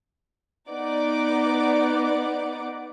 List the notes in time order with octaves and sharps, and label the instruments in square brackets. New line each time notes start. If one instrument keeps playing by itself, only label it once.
[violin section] B3 D#4 D5 F#5 D6